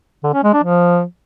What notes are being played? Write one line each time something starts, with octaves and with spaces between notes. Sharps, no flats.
D3
C#4
G#3
D4
F3